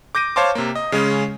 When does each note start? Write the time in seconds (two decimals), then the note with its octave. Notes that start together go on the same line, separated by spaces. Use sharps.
0.15 D6 G6 A#6 D7 D#7
0.36 C5 C#5 F5 A5 C6 D6
0.55 C3 A#3
0.75 D#5
0.92 C#3 G#3 C#4